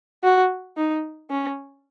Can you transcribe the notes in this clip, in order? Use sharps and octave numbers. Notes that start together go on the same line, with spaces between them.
F#4
D#4
C#4